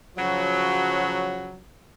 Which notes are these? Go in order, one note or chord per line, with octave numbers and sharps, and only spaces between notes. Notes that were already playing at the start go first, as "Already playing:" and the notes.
C#3 F3 F#3